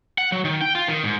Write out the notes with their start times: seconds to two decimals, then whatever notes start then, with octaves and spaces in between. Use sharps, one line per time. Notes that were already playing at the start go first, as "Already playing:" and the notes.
0.18 F#5
0.32 F#3
0.45 D#3
0.61 G5
0.75 F4
0.88 D#3
1.04 G#2